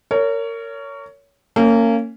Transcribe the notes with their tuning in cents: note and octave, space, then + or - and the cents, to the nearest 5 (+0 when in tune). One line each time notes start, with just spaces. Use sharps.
A#4 -25 C#5 +20
A#3 -30 C#4 +0